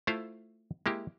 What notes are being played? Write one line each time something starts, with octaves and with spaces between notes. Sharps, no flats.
A3 E4 F4 C5 F5
G#3 A#3 E4 G4